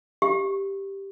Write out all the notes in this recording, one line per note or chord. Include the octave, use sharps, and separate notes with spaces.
G4